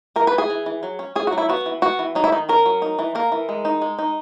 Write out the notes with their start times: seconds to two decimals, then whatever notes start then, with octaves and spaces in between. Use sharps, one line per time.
0.16 E3 A#4
0.27 B4
0.33 E3
0.38 G#4
0.50 E3
0.66 E3
0.83 F#3
0.99 C#4
1.15 C#4 G#4
1.27 F#4
1.32 F#3
1.38 E4
1.49 B3 F#4
1.66 E3
1.82 B3 F#4
1.99 E3
2.15 F#3 D#4
2.24 E4
2.32 D#3 D#4
2.49 C#4 A#4
2.66 F#3
2.82 D#4
2.99 E3
3.15 A#3 A#4
3.32 E3
3.49 G#3
3.65 D#4
3.82 G#3
3.99 D#4